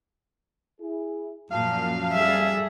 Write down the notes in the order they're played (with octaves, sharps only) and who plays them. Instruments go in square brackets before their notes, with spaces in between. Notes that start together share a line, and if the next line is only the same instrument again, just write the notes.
[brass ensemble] E4 G#4
[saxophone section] F#2 F5 [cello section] A#2 F3 [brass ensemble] A5
[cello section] G3 G#4 A4 [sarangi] E5